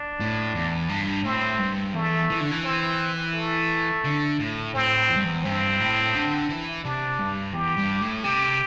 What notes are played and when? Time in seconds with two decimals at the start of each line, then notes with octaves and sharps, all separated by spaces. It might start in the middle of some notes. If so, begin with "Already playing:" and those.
Already playing: D4
0.20 A2
0.55 E2
0.89 G2
1.24 A2 C4
1.59 G2
1.94 E2 A3
2.30 E3
2.41 D3
2.51 E3
2.64 C4
3.34 A3
4.04 D3
4.40 A2
4.74 A2 C4
5.09 E2
5.16 G2
5.25 E2
5.44 G2 C4
5.80 A2
6.14 D3
6.49 E3
6.84 C3 D4
7.19 G2
7.54 E2 G4
7.77 G2
8.00 A2
8.24 C3 G4